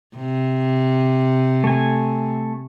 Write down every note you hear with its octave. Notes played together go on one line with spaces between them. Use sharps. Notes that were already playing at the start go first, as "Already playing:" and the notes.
C3
A3 G#5